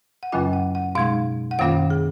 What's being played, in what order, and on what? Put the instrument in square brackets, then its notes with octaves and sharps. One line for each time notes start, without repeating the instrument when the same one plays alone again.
[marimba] F#5
F#2 C#3 F#3 C#4 F4 G#5
F#5
F#5
B2 G#3 D#4 F5
F#5
F#2 D#3 A#3 C#4 F4 F5
G#4